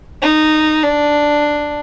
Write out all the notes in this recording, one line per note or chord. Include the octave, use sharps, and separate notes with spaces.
D#4
D4